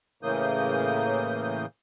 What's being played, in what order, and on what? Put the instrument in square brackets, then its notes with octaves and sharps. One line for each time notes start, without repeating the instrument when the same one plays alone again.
[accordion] A2 C#3 E3 A#3 D#6 G6